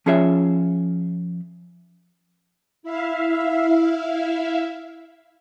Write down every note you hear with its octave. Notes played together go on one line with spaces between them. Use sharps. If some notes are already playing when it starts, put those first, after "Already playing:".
F3 C#4 F4 G#4 C#5 E5
E4 E5 F5